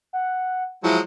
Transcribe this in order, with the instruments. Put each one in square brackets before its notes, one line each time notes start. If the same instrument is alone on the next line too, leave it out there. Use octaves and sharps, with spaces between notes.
[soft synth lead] F#5
[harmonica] F3 F#3 G#3 [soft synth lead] E4